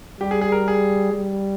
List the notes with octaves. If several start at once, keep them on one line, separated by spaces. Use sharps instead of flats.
G3 G4
G#4
G#4
A#4
G#4
G3